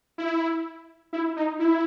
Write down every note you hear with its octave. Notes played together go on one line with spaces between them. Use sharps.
E4
E4
D#4
E4